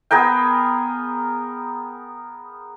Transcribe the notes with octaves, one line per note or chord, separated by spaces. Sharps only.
B3 G#4 A#4 G5